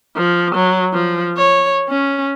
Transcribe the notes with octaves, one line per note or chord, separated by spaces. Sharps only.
F3
F#3
F3
C#5
C#4